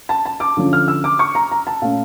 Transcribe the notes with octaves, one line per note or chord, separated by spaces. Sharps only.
A5
A5
D6
D3 F3 C#4
F6
E6
D6
C#6
A#5
A#5
A5
A#2 A3 C#4 F5